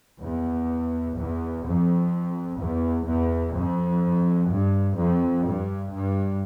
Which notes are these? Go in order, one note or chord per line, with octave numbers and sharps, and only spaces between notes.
E2
E2
F2
E2
E2
F2
G2
F2
G2
G2